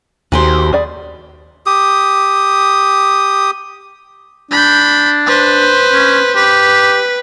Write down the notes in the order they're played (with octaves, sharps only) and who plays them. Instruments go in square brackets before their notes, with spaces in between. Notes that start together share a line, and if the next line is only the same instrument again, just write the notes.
[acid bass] D#2 [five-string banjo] D#4 G#5 [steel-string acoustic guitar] F#4 G4 C5
[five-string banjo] G#4 D5 B5
[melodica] G4 D#6
[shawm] D4 [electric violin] B5 G6
[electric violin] B4 C5
[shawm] C#4
[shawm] G4 [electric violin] B4